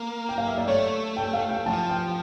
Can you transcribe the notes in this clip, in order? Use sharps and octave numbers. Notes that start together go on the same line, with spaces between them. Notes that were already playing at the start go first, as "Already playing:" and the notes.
Already playing: A#3
G5
F5
E5
D5
A3 C#5
G5
F5
G5
F3 A5
G5